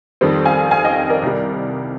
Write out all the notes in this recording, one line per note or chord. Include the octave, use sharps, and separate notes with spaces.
F2 D#3 G3 C4
F5 G#5
F5 G#5
D#5 G5
A#4 D5
C2 C3 G3